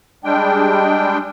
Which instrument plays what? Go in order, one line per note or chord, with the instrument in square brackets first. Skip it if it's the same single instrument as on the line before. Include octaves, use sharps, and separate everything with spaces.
[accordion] G3 G#3 D4 G5